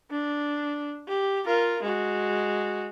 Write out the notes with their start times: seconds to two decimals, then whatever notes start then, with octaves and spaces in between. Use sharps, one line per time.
0.11 D4
1.08 G4
1.45 F4 A#4
1.82 G#3 F#4